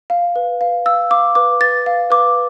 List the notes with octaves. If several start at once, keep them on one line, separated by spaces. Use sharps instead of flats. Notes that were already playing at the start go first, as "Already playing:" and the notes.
F5
B4
F5
F5 E6
F5 D6
B4 D6
B4 A6
F5
B4 D6